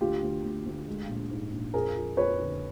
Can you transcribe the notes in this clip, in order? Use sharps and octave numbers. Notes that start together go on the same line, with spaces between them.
D2 F4 G4
D2
D2
D2
G#3
A#1
G#2
A#1
F2 G#4 A#4
F3
F2 B4 C#5
D3